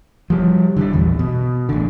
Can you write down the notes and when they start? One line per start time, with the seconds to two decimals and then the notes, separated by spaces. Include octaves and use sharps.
0.30 F3 G3
0.76 D3 E3 G3
0.93 A#1 E2
1.19 B2
1.69 A1 D3